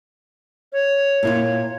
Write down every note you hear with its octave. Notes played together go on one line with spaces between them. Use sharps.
C#5
A#2 E4 F4